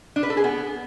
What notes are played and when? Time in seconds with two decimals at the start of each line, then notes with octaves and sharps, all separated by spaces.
0.16 D4
0.23 B4
0.30 A4
0.37 G#4
0.44 B3